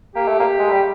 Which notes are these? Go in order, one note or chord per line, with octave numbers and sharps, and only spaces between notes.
A#3 G4
A3
A#3
G#3
G3